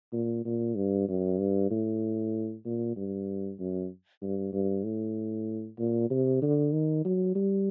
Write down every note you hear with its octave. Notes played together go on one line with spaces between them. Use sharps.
A#2
A#2
G2
F#2
G2
A2
A#2
G2
F#2
G2
G2
A2
A#2
C3
D3
D#3
F#3
G3